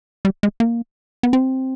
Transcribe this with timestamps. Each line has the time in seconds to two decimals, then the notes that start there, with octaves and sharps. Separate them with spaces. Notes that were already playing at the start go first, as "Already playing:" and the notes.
0.25 G3
0.43 G#3
0.60 A#3
1.23 B3
1.33 C4